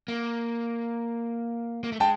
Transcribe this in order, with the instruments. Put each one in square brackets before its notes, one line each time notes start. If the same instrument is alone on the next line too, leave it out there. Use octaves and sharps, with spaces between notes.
[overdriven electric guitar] A#3
A#3
A3
[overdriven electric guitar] G#3 [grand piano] G5 A5